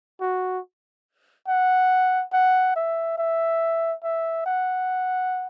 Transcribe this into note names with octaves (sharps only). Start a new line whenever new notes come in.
F#4
F#5
F#5
E5
E5
E5
F#5